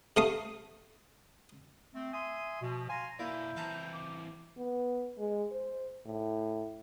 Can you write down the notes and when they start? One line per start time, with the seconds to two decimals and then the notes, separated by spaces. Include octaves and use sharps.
0.17 C3 A3 F5 D#6
1.93 A3 C4
2.12 E5 G#5 C6 D#6
2.61 B2 F3
2.88 F5 G#5 A#5 C6
3.19 B2 A#3 E4 D5 G6
3.56 E3 C4 F5 A5 A#5
3.92 D6
4.57 B3
5.18 G#3
5.52 C5
6.06 A2